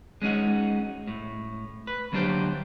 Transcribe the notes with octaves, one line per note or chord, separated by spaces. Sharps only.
G#3 C#4 D#4 F#4
A2
B4
D2 F#3 A#3 D4 G4 C5